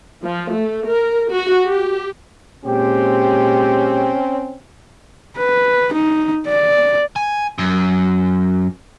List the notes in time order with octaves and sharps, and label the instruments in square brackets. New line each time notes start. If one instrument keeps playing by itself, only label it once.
[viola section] F3
A3
A#4
F#4
G4
[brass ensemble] A#2 G#3 G4 [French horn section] C4 C#4
[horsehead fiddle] B4
D#4
D5
[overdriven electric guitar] G#5
F#2